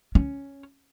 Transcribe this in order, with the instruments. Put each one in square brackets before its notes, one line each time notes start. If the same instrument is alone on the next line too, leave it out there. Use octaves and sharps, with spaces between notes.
[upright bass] C#4